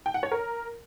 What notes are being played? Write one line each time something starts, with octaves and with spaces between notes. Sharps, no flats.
G5
F#5
C#5
A#4